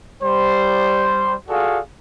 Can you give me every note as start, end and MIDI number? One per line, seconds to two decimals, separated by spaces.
0.23 1.35 55
0.23 1.35 72
1.49 1.79 65
1.49 1.79 66
1.49 1.79 68
1.49 1.79 69
1.49 1.79 74
1.49 1.79 77